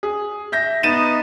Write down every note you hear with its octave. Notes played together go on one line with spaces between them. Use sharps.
G#4
E5 G6 A#6
B3 D#4 A6 D#7 E7